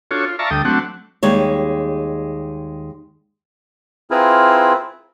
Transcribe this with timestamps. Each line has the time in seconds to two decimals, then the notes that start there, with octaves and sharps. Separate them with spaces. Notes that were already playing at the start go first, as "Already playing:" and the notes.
0.11 D4 F4 F#4 A4 C#5
0.25 F4
0.39 D5 E5 F5 A5 A#5 C#6
0.51 D2 G3 A4 G5 D#6
0.65 F#3 A3 C4 D4 F#5
1.23 D#2 G3 G#3 C#5
4.11 C4 E4 F4 G#4 A#4 B4